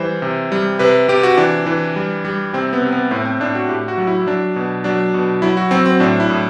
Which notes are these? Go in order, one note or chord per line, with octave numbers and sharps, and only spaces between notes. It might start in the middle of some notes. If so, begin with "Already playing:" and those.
Already playing: E3 G3 C5
C3
G3
C3 B4
C3 G4
F#4
E3 D4
E3
G3
G3
C3 C4
B3
C3
B3
A2 C4
C4
A2 D4
F#4
A2 G4
F#4
F#3
E4
F#3 D4
B2
F#3 D4
B2
F#3 E4
F#4
F#3 C4
C4
A2 D4
E4
A2